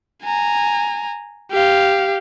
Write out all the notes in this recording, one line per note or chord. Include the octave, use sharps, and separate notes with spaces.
G#5 A#5
G4 F5